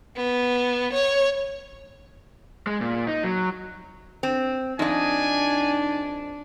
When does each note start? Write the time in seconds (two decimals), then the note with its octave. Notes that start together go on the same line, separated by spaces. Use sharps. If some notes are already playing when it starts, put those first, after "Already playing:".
0.17 B3
0.93 C#5
2.67 G#3
2.81 A#2
3.07 D#4
3.24 F#3
4.23 C4
4.79 F2 D4 D#4 D#5 G#5